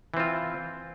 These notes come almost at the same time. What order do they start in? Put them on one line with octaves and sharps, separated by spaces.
E3 C4 F4